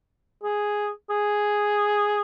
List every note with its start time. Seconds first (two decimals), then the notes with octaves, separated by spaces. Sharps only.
0.44 G#4
1.10 G#4